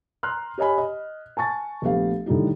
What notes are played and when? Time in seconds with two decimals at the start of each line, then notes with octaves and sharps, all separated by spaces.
0.23 A#5 C6 F6 F#6
0.58 G4 C#5 D#5 G#5 B5
0.78 D#5
1.37 G#5 A5 C#6 A6
1.82 A#1 A3 B3 G4 F5
2.26 A2 D3 D#3 G3 D#4 G4